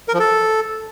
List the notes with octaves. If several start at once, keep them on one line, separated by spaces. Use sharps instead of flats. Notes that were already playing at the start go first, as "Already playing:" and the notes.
A#4
F3
A4